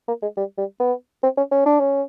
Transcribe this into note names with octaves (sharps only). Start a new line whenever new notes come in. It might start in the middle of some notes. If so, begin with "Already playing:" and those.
A#3
G#3
G3
G3
B3
C4
C#4
C#4
D4
C#4